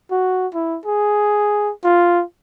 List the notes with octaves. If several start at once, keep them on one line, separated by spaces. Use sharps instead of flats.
F#4
E4
G#4
F4